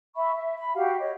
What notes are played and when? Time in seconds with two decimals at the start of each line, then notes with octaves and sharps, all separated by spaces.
0.16 E5 B5 C#6
0.36 E5
0.57 B5
0.74 F#4 G4 F5 F#5
1.00 C#5 D#5